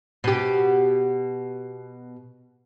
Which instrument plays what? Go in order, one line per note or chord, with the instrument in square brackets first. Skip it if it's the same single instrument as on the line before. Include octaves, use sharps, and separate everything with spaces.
[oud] B2 G4